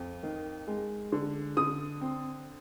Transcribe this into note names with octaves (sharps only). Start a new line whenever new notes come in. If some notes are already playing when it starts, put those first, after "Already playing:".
Already playing: F2
D#3
G#3
D3
D3 D#6
C4